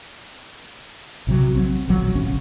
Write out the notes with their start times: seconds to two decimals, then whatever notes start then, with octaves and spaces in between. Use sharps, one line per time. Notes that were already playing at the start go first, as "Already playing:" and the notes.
1.27 A#1 C3 F#3
1.56 F#3 G3 C4
1.88 E1 A#1 F3 F#3
2.13 E1 A1 C#3 C#4